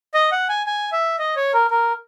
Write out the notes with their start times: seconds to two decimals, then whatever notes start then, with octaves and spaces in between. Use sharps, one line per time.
0.14 D#5
0.32 F#5
0.49 G#5
0.66 G#5
0.92 E5
1.19 D#5
1.36 C#5
1.54 A#4
1.71 A#4